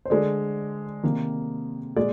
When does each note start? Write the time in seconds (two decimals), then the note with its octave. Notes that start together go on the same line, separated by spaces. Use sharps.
0.05 C5
0.10 D3 G#3 D5
1.03 C3 D#3 A#3
1.96 A#2 G#3 D5